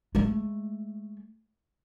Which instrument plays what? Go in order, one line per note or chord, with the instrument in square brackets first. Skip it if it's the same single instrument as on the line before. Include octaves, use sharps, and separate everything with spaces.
[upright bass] G#3 A3